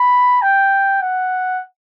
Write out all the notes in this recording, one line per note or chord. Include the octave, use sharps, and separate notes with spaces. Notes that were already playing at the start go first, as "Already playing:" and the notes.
Already playing: B5
G5
F#5